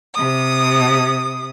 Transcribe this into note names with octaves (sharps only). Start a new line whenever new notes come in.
C3 D#6